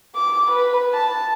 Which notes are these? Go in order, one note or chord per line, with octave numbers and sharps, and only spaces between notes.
D6
B4
A5